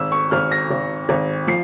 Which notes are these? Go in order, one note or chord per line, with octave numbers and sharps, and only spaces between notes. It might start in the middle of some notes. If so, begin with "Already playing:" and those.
Already playing: G#1 E6
C#6
G#1 F6
A#6
G#1
G#1
F3 C7